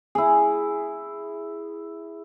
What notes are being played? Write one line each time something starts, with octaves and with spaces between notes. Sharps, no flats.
E4 G#4